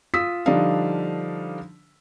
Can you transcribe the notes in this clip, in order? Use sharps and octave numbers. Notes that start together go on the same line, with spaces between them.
F4 D#6 E6 B6
D3 F3 G3 D4 D#4 F5